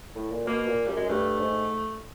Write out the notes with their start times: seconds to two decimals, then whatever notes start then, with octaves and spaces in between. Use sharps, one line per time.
0.15 A2
0.31 A#2
0.47 B2 A#3
0.67 A#2
0.86 F#2 G3
0.97 F#2 G#3
1.09 G2 A3
1.40 G#2